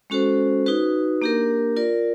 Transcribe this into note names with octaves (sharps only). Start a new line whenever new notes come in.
G#3 C#4 F#4 A4 C5
D#4 F#4 B4
A#3 D4 G4 A#4
F4 A#4 D5